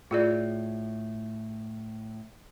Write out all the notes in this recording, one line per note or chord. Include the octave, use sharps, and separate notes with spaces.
A2 F4 G#4 D5